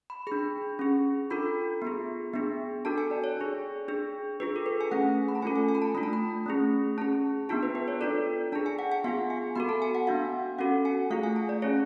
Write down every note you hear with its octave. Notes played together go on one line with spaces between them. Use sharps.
B5
D4 G#4 B5
C#4 G#4
D4 F4 A4 B5
B3 F4 G#4
B3 D4 G#4
D4 F#4 A4 A5
G#5
D5
C#5
D4 G#4
D4 G#4
D4 F4 G#4 B4
A4
B4
G#5
A3 C#4 G#4 F#5
B5
A5
A3 C#4 F4 A4 G#5
G#5
G#5
B5
A5
A3 D4 F4 B5
A5
B5
A3 C#4 G#4
C#4 G#4 A5
B3 D4 F4 G#4 A5
B4
B4
C#5
D4 F4 A4 D5
D4 G#4 A5
G#5
F#5
G#5
B3 F4 G#4 F5
G#5
B3 F#4 A4 B5
A5
G#5
F#5
B3 D4 F#4 F5
C#4 F#4 A4 F#5
G#5
A3 F4 G#4 F5
G#5
A5
D5
C#4 G#4 C#5